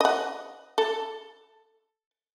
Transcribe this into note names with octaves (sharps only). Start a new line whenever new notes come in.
D#5 F#5
A4